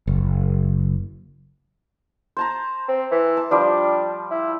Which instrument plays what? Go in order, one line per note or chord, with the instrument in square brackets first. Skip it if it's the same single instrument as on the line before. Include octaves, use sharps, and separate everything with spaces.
[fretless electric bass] F#1
[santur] C5 A5 A#5
[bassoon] C4
E3
[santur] A5
[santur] F3 G3 G4 [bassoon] D4
[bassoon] E4